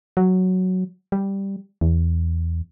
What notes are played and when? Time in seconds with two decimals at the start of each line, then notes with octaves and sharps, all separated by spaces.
0.17 F#3
1.12 G3
1.81 E2